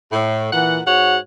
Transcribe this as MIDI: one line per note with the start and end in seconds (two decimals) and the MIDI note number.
0.11 0.49 45
0.51 0.79 46
0.51 0.79 52
0.51 0.79 78
0.86 1.17 44
0.86 1.17 66
0.86 1.17 73
0.86 1.17 78